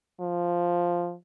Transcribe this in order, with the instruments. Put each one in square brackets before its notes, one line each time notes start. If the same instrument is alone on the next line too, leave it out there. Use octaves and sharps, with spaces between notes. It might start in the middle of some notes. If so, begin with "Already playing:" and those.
[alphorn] F3